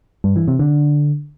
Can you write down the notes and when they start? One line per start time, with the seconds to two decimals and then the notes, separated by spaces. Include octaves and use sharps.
0.24 G2
0.36 E3
0.48 C3
0.59 D3